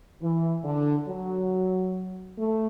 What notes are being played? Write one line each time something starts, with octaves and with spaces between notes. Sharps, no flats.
E3
D3
F#3
A3